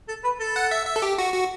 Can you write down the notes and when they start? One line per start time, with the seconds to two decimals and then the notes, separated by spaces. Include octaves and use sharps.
0.08 A4
0.24 B4
0.40 A4
0.56 F#5
0.71 E5
0.86 E5
0.96 A4
1.02 G4
1.18 F#4
1.33 F#4